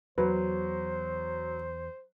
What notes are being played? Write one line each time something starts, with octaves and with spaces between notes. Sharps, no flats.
E2 F#3 B4 C5